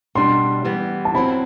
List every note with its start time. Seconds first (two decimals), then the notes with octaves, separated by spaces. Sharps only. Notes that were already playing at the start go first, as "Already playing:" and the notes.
0.15 B2 G3 D4 C6
0.65 E3 G3 B3
1.05 A5
1.15 F#3 C4 E4 B5